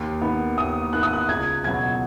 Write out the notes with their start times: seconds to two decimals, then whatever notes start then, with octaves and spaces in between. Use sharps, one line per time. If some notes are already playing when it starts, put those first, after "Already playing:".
Already playing: D#2
0.22 D#3 B3
0.58 D#2 D#6
0.93 D#3 B3 F#6
1.03 D#6
1.13 F#6
1.28 C#2 G#6
1.64 B2 F#3 B3 G#6